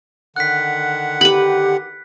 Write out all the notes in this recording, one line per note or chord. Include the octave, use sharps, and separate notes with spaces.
D3 D#3 F#5 F#6 B6
G4 B4 B5